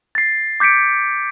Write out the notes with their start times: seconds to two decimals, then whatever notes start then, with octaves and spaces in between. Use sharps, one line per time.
0.15 A6 C7
0.60 D6 G6 B6 C#7 D7